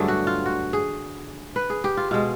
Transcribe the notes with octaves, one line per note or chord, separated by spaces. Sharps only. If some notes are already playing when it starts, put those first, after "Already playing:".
Already playing: G2 D3 F#3 A3 G#4
F#4
F4
F#4
G#4
B4
G#4
G4
F4
B2 G#3 F4